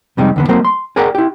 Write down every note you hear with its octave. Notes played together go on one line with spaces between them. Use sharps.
F2 C3 G3 G#3 D#4
E2 D3 B3
F#3 A3 A#3 C4 A#4 C5
C6
G#4 A#4 D5 F#5 G5 A#5
E4 G4